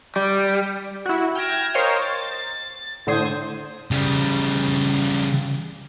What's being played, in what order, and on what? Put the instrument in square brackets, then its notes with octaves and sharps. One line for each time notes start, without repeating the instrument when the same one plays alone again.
[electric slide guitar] G3
[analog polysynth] E4 F#4
G5 F6 G#6 A#6 E7
A#4 C5 C#5 D#5 F5 G5
A6
A2 D3 C5 D#6 G#6
[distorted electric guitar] C#3 G3